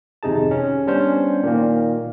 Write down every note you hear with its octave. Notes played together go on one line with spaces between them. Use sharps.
G#1 F2 C3 D#4 G#4 A5
C#4
G3 B3 C#4 D4 C5
A#2 D#3 A#3